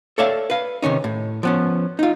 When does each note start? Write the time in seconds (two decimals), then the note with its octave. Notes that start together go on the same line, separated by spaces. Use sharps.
0.18 A4 C#5 D5 E5 F5 A5
0.50 B4 F5
0.82 C3 D#3 C#4 D#4
1.04 A2
1.43 F3 B3 C#4
1.99 D#4 F4